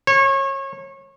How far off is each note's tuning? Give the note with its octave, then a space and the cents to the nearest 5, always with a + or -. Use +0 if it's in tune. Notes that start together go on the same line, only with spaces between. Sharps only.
C#5 -30